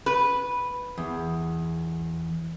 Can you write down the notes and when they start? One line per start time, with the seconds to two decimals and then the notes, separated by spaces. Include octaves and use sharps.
0.06 B4
0.98 E2